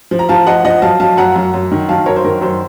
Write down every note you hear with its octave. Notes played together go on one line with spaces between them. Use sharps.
F3
A#5
F3 F5 A5
F3 D#5 F#5
F3 D#5 F#5
F#3 F5 A5
F#3 F5 A5
F#2 F#5 A#5
F#2
F#2
D#3
F#3 F5 A5
F#2 A#4 C#5
C5
D#3 A#4
F#2 C5